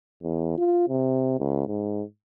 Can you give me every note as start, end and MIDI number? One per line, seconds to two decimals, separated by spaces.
0.23 0.57 40
0.57 0.86 65
0.88 1.37 48
1.39 1.66 37
1.67 2.02 44